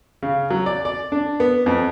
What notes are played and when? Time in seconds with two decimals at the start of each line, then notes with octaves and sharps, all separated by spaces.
0.23 C#3
0.50 F#3
0.66 D5
0.85 D5
1.12 D4
1.40 B3
1.66 F2